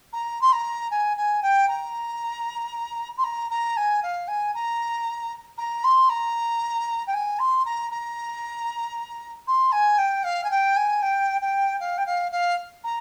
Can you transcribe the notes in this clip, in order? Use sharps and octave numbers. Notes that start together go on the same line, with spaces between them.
A#5
C6
A#5
G#5
G#5
G5
A#5
C6
A#5
A#5
G#5
F5
G#5
A#5
A#5
C6
A#5
G5
G#5
C6
A#5
A#5
C6
G#5
G5
F5
G#5
G5
G#5
G5
G5
F5
G5
F5
F5
A#5